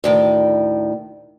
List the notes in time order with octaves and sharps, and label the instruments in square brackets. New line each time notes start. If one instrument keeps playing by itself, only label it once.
[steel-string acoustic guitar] D2 A2 D#3